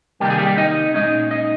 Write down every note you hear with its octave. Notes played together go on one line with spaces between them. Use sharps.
C3 D#3 G3 A#3 D#4 G4
G#4
G3 G4
D#4 D#5
A#2 G#3 C#4 D#4 D#5
D#4 D#5